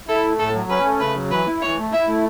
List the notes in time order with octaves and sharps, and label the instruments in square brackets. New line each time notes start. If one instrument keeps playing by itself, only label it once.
[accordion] E4 [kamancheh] A4
[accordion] A3
[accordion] A2 [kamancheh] A4
[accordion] F#3
[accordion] C#4 [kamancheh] B4
[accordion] A3
[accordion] C#3 [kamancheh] B4
[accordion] F#3
[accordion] E3 [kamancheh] B4
[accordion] E4
[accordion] E3 [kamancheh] C#5
[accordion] A3
[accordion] E4 [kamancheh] E5
[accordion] A3